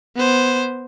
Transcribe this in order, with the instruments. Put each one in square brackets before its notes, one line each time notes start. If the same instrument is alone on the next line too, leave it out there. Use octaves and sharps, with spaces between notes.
[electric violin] B3 C5